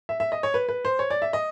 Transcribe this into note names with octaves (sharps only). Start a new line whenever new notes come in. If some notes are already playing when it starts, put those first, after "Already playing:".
E5
E5
D#5
C#5
B4
B4
C5
C#5
D5
E5
D#5